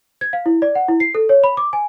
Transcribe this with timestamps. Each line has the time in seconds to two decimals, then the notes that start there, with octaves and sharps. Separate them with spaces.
0.21 G#6
0.33 F5
0.46 E4
0.62 D5
0.75 F#5
0.88 E4
1.00 C7
1.15 A4
1.29 C#5
1.44 B5
1.57 D6
1.73 G#5